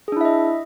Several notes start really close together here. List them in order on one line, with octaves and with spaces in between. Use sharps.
G#4 D4 E4 E5 D#5